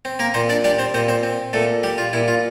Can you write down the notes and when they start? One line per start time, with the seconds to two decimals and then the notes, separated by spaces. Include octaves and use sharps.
0.05 C4
0.19 A#3 A#4
0.34 A#2 C4 C5
0.49 D4 D5
0.64 G3 D4 D5
0.79 C4 C5
0.94 A#2 C4 C5
1.08 C4 C5
1.23 C4
1.53 A#2 A3 A4
1.83 G3 G4
1.98 F4
2.13 A#2 E4
2.28 F4